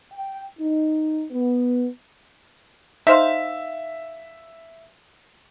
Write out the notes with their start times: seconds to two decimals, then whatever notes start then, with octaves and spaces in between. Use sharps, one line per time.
0.13 G5
0.59 D#4
1.31 B3
3.07 D#4 C5 E5 F5